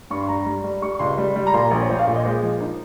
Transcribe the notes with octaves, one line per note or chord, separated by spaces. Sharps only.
G2 C#6
C6
G3 A#5
G3
G3
G3 C#6
C#2 C6
G3
G3
A#5
A#2 C6
A#1
C#5
A#1 C5
F5
A#2
D#5
G#3 C5
F3
D#4